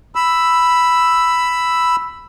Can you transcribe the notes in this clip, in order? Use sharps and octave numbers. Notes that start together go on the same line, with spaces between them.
B5 E6